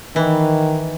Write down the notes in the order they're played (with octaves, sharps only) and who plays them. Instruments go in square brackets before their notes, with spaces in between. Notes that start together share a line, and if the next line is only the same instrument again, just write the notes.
[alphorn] D#3 [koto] E3